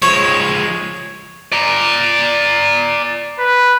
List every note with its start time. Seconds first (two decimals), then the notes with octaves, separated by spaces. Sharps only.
0.02 F3 G#3 C#5
1.52 D5 A#5
3.39 B4